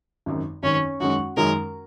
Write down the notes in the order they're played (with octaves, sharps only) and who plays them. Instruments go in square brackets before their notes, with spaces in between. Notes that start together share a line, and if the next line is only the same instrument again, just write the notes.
[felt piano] G#1 F#2 D#3
[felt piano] G#1 F#2 D#3 [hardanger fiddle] C#4
[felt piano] F#2 D#3 G#3 C#4 [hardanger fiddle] F#4
[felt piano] F#2 D#3 G#3 C#4 [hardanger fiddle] A#4